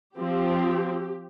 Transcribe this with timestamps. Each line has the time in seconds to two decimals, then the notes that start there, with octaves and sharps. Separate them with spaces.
0.17 F3 C4 G4